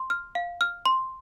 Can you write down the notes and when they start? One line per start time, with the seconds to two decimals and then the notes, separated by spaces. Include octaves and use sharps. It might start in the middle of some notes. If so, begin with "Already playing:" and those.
Already playing: C6
0.10 F6
0.35 F5
0.61 F6
0.86 C6